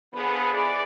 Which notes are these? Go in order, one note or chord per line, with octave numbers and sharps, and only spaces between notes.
D3 F3 B3 G#4 B5
E3 D5